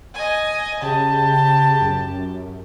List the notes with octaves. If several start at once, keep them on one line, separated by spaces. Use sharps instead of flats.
D#5 G#5
C#3 G4 A5
F#2